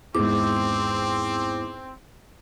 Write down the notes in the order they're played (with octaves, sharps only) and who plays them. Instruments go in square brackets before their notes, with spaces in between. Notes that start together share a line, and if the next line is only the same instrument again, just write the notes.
[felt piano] G#1 E2 [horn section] C4 [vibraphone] D6